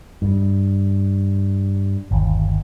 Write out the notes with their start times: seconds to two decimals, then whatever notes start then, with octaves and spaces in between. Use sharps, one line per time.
0.22 G2
2.11 G1 D#2